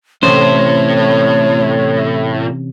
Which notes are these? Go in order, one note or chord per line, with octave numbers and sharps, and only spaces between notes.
A2 C3 E3 C#4 C5 C#5